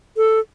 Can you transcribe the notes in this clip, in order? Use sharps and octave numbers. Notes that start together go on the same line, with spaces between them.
A4